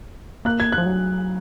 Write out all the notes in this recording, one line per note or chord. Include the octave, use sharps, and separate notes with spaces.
A#3 F#6
G#6
F#6
F3
F#3